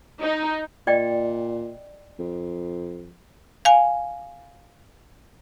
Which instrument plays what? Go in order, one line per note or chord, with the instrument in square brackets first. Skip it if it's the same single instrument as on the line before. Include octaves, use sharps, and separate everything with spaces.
[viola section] D#4
[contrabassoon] A#2 [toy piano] D5 D#5 G5
[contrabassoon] F2
[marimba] F5 G#5